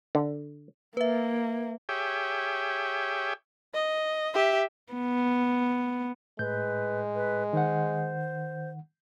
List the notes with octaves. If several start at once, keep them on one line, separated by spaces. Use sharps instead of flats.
D3
A#3 B4 E5
G4 G#4 C#5 E5 G5
D#5
G4 E5
B3
A2 G#3 B4 G6
B4
D#3 C5 F#5